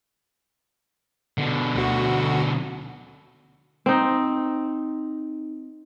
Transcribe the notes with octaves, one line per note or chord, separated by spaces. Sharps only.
B2 D3
D2 F#4
C4 D#4